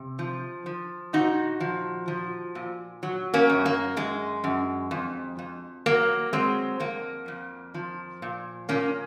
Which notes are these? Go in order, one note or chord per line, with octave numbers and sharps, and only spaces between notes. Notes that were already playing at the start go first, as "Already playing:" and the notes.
Already playing: C3
F3
F3
A#2 D#4 F#4
F3
F3
A#2
F#3
A#3 C#4
F#2
A#3
F#2 G#3
F#2
F2
F2
F#3 A#3
F#3 G#3 C4
F2 A#3
F2
F3
A#2
A#2 A#3 C#4